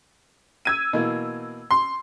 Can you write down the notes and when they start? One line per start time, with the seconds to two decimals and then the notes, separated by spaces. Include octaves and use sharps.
0.65 E6 G#6 D#7
0.93 B2 E3 A#3
1.71 C6